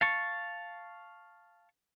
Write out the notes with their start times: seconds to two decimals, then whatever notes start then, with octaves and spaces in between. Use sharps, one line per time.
0.01 F5 A5 C#6